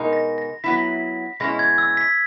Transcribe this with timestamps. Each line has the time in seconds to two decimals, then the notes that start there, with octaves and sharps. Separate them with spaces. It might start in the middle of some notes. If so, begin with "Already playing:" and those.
Already playing: B2 G#3 D#4 A#4
0.13 A#6
0.38 A#6
0.64 F#3 B3 E4 B6
1.40 B2 G#3 C#4 E4 A#6
1.59 G#6
1.78 E6
1.97 B6